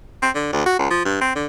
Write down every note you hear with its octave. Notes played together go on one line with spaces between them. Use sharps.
C4
D3
D2
F#4
C#2
F3
G2
C4
D3